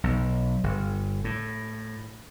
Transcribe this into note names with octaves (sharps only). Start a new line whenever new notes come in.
B1
G1
A2